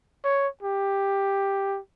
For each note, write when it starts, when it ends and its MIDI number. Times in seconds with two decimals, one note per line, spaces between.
0.24 0.47 73
0.62 1.79 67